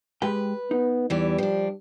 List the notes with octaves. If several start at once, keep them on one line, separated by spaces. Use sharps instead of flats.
G#3 G4 B4 G5
B3 D#4
E2 E3 G3 G4
F3 D4